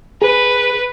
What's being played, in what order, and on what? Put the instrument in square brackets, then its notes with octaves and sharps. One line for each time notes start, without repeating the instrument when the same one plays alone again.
[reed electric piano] G#4 [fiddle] B4